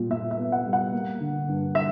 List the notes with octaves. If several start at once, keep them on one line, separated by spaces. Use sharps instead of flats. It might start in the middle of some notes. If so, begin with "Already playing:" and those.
Already playing: A#2 G3
A#2 E5
E5
B3
F#5
G3
F#5
A#3
D3
G2
E5